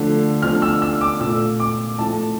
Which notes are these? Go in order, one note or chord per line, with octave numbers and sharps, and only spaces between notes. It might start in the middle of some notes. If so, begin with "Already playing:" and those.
Already playing: D3 F3 A3
D3 F3 A3 F6
E6
E6
D6
A#2 A3 E6
D6
A2 F3 A3 A5